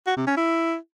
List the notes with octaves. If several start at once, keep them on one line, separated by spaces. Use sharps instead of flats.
F#4
C3
C#4
E4